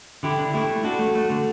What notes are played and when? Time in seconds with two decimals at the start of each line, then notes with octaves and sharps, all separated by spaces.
0.23 D3 E4 G4
0.38 D4
0.54 A3 E4 G4
0.69 A3
0.84 D4 F#4 A4
0.99 A3
1.15 A3
1.30 D3